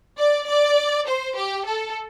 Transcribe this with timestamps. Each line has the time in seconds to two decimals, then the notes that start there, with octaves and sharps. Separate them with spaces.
0.17 D5
0.47 D5
1.06 C5
1.36 G4
1.66 A4